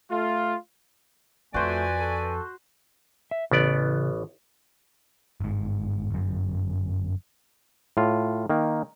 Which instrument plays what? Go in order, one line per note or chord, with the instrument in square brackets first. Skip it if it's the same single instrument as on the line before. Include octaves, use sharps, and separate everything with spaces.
[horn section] A3 F4
[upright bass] F2 [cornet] A3 [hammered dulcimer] F#4 C5 [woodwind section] B4 D5 G#5
[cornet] A4
[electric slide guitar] E5
[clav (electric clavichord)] A1 B3 D5 [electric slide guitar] C#3
[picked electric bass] G1 G#2
G1 F#2
[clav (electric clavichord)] A2 F4
D#3 A#3